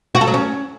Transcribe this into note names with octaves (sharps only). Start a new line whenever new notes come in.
F#4
A4
F#3
C#4